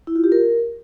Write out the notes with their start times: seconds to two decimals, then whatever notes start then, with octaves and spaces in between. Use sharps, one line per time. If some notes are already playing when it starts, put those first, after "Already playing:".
0.07 E4
0.15 F4
0.24 G4
0.32 A#4